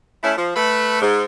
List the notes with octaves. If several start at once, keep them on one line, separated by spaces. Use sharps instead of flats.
A3 C#4 E4
F3
A3 B4
G#2